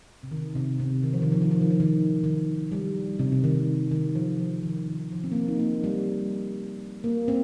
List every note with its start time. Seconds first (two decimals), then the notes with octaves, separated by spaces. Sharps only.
0.23 C3
0.31 D#3
0.55 C3
0.79 C3
1.03 D#3
1.13 F3
1.22 D#3
1.32 F3
1.41 D#3
1.51 F3
1.60 D#3
1.71 F3
1.80 D#3
2.24 D#3
2.72 G3
3.19 C3
3.32 C3
3.44 D#3
3.56 D#3
3.91 D#3
4.15 F3
4.40 F3
4.63 D#3
4.88 D#3
5.12 F3
5.24 C4
5.32 A#3
5.35 C4
5.48 D#4
5.59 A#3
5.84 G3
7.04 A#3
7.28 C4